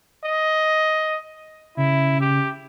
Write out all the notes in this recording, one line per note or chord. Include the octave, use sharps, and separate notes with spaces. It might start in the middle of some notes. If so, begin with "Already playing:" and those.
D#5
C#3 E4
G4